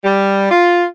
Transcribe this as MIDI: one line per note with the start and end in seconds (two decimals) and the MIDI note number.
0.04 0.50 55
0.51 0.84 65